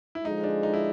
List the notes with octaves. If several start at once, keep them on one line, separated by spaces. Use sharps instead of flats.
E4
D3 F3 G#3 D#4
D4
D#4
E4